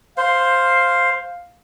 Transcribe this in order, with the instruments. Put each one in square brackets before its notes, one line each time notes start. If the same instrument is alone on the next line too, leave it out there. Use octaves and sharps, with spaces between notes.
[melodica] C5 [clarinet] F5